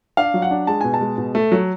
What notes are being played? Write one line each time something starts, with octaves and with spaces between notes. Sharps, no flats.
D4 F5
F#3
F#5
D4
G#3 A5
B2 G#5
A5
G#3
B2
A3
F#3